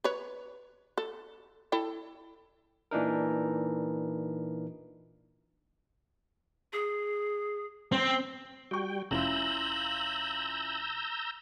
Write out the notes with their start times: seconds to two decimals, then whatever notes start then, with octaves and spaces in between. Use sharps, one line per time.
0.04 B4 C#5
0.98 A4
1.72 E4 A4 G5
2.91 A#2 E3 D4 D#4 A#4
6.73 G#4
7.92 C4
8.71 G3 F#4 G5 C#6
9.11 F1 C#4 E4 F4 A#5 E6 G6 F#7